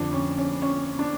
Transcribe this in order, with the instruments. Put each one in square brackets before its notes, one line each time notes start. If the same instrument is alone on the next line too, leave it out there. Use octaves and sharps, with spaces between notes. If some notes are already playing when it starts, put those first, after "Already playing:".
Already playing: [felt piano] F2 D3 F3 D4
C#4
C#4
C#4
D4